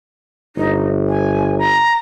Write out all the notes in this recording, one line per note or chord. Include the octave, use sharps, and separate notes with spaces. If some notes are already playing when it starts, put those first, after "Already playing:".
G1 D#4
G#5
A#5